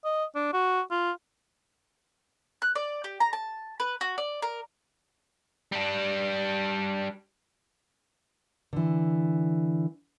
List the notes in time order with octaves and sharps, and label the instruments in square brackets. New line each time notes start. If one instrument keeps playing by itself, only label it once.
[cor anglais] D#5
D4
F#4
F4
[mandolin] F#6
D5
G4
A#5
A5
B4
F#4
D5
A#4
[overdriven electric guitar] G3 D4
[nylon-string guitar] D3 E3